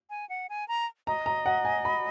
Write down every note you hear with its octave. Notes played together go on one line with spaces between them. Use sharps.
G#5
F#5
G#5
A#5
D#5 A#5
A#5
F#5
G#5
B5